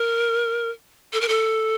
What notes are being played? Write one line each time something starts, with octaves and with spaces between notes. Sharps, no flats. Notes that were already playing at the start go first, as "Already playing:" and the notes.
Already playing: A#4
A4
A#4
A4